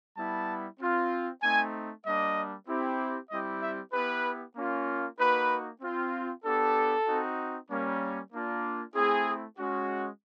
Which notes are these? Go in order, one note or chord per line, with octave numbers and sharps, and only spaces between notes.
G3 B3 E4 A5
C4 F4
A3 C4 D#4 G#5
G3 A#3 D4 D#5
C4 E4 G4
G3 C4 E4 G4 D#5
E5
B3 E4 G4 B4
A#3 C#4 F4
A#3 D#4 F#4 B4
C4 F4
B3 D4 G4 A4
C4 D#4 F#4
G3 A#3 C#4
A#3 D4 F4
A3 C4 E4 G#4
G#3 C#4 F#4